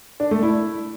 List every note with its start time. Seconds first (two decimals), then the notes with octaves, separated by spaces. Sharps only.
0.20 D4
0.31 A3
0.43 E4